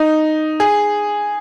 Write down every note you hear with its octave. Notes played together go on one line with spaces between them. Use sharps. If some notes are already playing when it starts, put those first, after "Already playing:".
Already playing: D#4
G#4